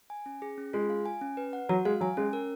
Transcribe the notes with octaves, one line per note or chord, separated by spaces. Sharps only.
G#5
C#4
G#4
C#4
G#3 F4
F5
G#5
C#4
B4
F#5
F#3 F#4
G#3 F5
F#3 G#5
G#3 C#4
A#4